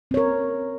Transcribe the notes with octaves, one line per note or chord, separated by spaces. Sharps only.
C4 A#4 C#5